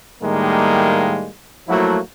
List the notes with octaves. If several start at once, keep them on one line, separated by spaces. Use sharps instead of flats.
A2 D#3 G3 G#3 A#3
F3 F#3 A3 A#3 E4 F#4